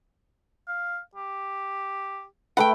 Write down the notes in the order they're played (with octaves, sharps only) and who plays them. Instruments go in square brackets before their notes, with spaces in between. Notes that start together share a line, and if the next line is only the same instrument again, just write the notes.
[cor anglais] F5
G4
[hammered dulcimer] A3 B4 [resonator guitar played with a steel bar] F#5 G5